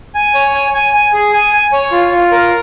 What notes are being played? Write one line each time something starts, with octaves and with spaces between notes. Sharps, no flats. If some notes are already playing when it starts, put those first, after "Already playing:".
G#5
C#5
G#5
G#5
G#5
G#4
G#5
G#5
C#5
F4
F4
A#4